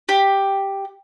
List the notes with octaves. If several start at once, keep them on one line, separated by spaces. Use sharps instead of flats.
G4